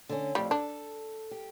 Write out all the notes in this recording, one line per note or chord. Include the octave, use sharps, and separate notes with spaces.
D3 C#4
F2 A2 G3
D4 A4
G4